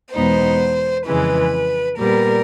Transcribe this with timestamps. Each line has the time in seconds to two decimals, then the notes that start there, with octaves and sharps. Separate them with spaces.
0.14 E2 B2 G#3 B3 D#4 C5
1.06 F2 C#3 E3 G#3 B4
1.98 A#2 G3 B3 A#4